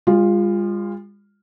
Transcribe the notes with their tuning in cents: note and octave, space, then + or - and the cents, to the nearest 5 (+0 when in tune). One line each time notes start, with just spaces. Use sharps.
G#3 -45 F4 +0